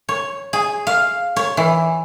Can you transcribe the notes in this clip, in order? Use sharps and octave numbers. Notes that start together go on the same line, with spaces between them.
C#5
G#4
F5
C#5
E3